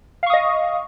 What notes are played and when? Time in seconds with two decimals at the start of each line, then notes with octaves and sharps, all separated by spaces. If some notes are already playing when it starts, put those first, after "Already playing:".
0.23 F5
0.26 C#6
0.30 D#6
0.34 D#5